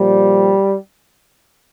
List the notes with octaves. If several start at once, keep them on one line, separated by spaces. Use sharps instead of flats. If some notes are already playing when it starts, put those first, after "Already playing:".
Already playing: A#2 F3 G3